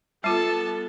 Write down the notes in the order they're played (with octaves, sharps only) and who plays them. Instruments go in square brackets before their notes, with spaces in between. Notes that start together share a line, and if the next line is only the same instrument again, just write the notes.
[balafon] G3 F4 [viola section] B3 A4 [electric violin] A5